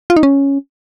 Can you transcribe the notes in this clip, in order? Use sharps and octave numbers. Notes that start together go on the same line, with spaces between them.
F4
D#4
C#4